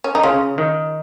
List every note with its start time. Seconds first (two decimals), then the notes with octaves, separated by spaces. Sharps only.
0.04 C#4
0.15 D#4
0.23 C#3 C#4 F4
0.58 D#3